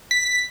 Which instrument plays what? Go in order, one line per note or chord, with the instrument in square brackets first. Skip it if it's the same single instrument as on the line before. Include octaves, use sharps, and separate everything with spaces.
[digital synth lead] B6